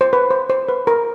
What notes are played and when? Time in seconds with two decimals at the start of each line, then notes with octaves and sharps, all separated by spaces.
0.01 C5
0.13 B4
0.31 C5
0.50 C5
0.69 B4
0.87 A#4